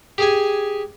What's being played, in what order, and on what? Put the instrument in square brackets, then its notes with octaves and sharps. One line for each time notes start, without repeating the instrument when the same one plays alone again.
[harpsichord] G4 G#4 G#5